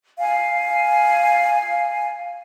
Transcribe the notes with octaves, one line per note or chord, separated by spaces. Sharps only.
F5 G#5